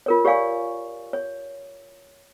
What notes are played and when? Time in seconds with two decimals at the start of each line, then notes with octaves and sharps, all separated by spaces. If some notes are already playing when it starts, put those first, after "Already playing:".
0.06 F4 A#4 C#5
0.25 G4 C#5 D5 F5 G#5 C#6
1.13 C#5